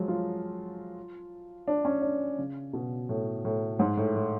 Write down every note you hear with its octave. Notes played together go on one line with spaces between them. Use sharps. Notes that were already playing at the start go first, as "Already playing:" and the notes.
Already playing: F3 F#3 G#3
F4
D4
C#4
D4
C#3
B2
A2
A2
G#2
A2
A2